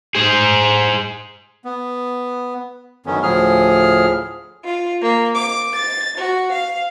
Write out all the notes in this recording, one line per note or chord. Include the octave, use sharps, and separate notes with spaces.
G#4 C5
B3
F#2 D3 D#3 B3 C#4
D2 A2 F3 G#4 F6
F4
A#3
D6
A6
F#4
F5